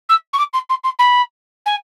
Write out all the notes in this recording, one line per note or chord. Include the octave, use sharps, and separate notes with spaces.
E6
C#6
D6
C6
C6
C6
B5
G#5